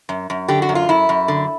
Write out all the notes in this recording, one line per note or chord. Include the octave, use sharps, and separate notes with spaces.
F#2
F#2
D3 G4
F#4
F#2
F4
F#2 E4
F#2
D3